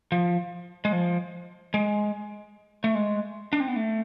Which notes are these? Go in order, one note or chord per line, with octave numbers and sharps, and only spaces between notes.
F3
G#3
F3
G#3
A3
G#3
D4
C4
B3
A3